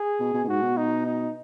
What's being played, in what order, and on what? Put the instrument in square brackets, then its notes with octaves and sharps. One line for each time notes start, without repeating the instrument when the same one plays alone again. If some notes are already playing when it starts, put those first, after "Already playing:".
Already playing: [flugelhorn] G#4
[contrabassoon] B2
B2
B2
[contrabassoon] G#2 [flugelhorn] F#4
[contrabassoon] B2
[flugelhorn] D#4
D#4